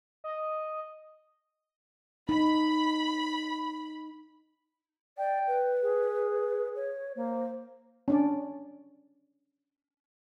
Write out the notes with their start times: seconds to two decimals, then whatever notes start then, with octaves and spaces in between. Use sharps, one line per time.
0.24 D#5
2.29 D#4 B5
5.18 D5 G5
5.47 B4
5.83 G#4
6.75 C#5
7.16 A#3 C5
8.08 C#4 D4 D5